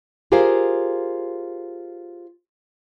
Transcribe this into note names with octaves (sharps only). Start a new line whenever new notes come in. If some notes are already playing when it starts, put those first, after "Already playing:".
F4 G4 G#4 A#4 C5 F5